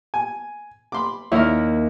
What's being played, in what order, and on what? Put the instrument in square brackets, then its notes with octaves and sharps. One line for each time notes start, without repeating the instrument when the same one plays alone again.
[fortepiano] G#5
B5 C6 D6
[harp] D#2 A#4 [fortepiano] E4 C#5 E5